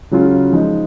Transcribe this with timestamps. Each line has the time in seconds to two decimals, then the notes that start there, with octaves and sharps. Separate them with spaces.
0.11 C#3 F#3 C#4 F4
0.52 F3 G#3 D#4